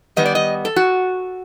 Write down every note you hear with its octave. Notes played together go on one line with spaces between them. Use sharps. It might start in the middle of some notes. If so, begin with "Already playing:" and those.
D#3 G3 B3 D#5
D5
D#5
A4
F#4